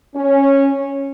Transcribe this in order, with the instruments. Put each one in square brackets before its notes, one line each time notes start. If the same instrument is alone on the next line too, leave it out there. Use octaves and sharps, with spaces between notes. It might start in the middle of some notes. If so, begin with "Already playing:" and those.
[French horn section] C#4